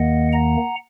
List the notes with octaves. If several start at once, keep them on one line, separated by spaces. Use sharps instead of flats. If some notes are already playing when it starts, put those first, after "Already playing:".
Already playing: D#2 D#3 A#3 D#5 F#5
F#5 A#5